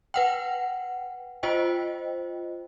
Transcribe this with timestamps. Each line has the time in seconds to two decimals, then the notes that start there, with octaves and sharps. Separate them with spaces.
0.14 B4 F#5 G5
1.43 F4 C5 D#5 G5